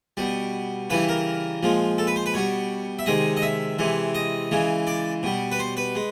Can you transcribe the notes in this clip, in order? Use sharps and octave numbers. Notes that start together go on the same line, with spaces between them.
B2 G3
C#3 E3 G3 B4
A#4
A#2 F3 G#3
A4
B4
C5
B4
B2 G3 C#5
E5
C3 D#3 G#3 D#5
D#5
E5
C3 E3 G#3
D#5
C#3 E3 G#3
D5
B2 G3
B4
C5
B4
G#3